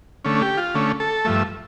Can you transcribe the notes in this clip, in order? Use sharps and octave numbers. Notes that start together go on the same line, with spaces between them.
D3 A3 C#4
G4
F4
D3 A3 C#4
A4
G2 F3 A3 E5